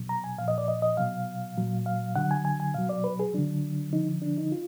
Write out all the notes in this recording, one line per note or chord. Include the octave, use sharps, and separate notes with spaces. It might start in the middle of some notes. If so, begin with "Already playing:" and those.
Already playing: B2 F#3
A#5
G#5
A#2 F3 F5
D#5
D5
D#5
D#5
B2 F#3 F5
A#2 F#3
F5
D3 F#3 F#5
G#5
G#5
G#5
B2 F#3 F5
D5
B4
G#4
D3 F#3 D4
D3 F3 D#4
D4
D#4
F4